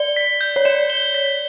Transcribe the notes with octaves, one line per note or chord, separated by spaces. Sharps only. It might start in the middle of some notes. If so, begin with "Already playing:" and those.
Already playing: D5 G7
B6
G6
C#5
D5 E7
G7
B6